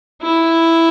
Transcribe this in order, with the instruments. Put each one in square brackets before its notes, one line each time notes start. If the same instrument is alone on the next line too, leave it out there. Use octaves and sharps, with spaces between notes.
[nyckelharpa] E4